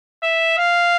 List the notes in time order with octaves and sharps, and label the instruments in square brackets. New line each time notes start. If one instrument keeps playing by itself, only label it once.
[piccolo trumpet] E5
F5